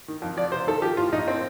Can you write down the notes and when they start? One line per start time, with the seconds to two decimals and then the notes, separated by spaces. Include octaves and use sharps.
0.08 D#3
0.22 F2
0.37 F2 D5
0.52 C3 C5
0.67 D#3 A4
0.82 F3 G4
0.97 A2 F4
1.12 A#1 D#4
1.27 A2 C4